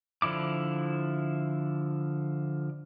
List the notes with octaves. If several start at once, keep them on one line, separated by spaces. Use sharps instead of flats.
D3 F3 E4 D6